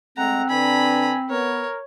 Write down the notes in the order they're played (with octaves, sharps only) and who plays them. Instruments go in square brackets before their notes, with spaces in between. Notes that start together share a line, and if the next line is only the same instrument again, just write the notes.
[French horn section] G#3 A3 [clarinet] C4 [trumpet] F#5 [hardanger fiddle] A#5
[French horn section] D3 D4 B4 [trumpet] G#5 [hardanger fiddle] A#5 B5
[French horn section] B3 [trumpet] A#4 [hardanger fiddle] C#5